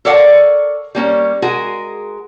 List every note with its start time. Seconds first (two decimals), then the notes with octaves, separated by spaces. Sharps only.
0.05 A4 A#4 C#5 D5 F5 F#5
0.95 G3 A#3 C#4
1.42 G#3 F#4 G#4 A#4